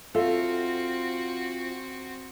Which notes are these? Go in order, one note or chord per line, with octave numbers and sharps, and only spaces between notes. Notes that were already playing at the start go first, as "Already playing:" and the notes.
C4 F4 F#4 A4 E5